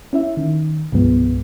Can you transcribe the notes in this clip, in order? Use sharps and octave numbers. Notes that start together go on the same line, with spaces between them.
C#4 E4 E5
D#3
C2 G2 B2 F3 G#3 B3